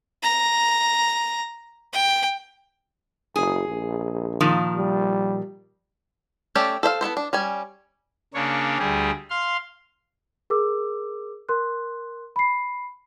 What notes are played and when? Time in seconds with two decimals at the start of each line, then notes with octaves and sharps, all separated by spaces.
0.23 A#5
1.94 G5
3.36 F#1 G#4
3.68 A#1
4.41 A#2 D#3 F3
4.76 G3
6.55 A3 C#4 G4 A4 D5
6.83 A4 C5 E5 F5
7.01 B3 E4 A4 C5
7.17 D4
7.33 G3 C#4 G#5
8.34 C#3 A#3 D4 C#5
8.79 D2 G3 G4 G#4
9.30 F5 C6
10.50 G#4 A#4 D6 E6
11.49 A#4 C6 F#6
12.36 B5 C7